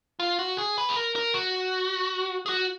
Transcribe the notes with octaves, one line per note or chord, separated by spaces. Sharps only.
F4
F#4
G#4
B4
G#4
A#4
A#4
F#4
G#4
F#4